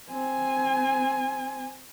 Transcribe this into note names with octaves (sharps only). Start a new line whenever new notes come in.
C4 G#5